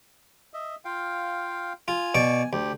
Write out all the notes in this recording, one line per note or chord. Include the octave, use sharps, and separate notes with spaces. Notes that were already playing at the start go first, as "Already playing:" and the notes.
D#5 E5
F4 F5 G5
F4 G#5
B2 D5 C#6
D2 G4